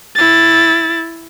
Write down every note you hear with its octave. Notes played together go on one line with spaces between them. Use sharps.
E4 A6